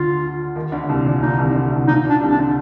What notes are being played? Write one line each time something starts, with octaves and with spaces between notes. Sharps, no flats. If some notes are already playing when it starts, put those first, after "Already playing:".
Already playing: D2 D3 F4
D#2 D#3
D2 D3
D3
C2 C3
A#2
A#2 D#4
C2 C3
D2 D3
C2 C3
A#2 D#4
A#2
D4
C2 C3
D4
D3